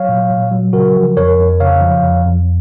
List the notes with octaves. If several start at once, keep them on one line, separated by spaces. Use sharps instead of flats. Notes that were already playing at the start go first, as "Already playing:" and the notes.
Already playing: F#3 C#5 F5
A#2
A#2
F#3
C#3 F#4 A#4
F3
F2 A#4 C#5
F2
C#3 C#5 F5
F3
F2
F2